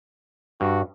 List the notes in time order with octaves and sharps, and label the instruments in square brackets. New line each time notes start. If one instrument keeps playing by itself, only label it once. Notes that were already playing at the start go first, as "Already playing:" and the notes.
[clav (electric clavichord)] G2 [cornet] F#4